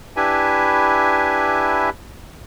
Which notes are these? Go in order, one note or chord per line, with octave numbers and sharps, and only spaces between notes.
D4 E4 G4 B4 E5 G#5